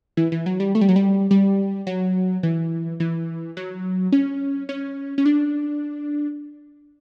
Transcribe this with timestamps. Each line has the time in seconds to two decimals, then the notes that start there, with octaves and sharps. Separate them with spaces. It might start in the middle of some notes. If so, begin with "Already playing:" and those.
0.17 E3
0.32 E3
0.46 F#3
0.60 G3
0.75 A3
0.81 G3
0.89 F#3
0.96 G3
1.31 G3
1.87 F#3
2.43 E3
3.00 E3
3.57 F#3
4.12 C#4
4.69 C#4
5.18 C#4
5.26 D4